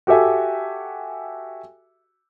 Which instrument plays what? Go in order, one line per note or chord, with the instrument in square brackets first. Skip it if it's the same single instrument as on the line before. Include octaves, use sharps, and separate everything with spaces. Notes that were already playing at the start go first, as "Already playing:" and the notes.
[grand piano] F#4 G4 A4 E5 G#5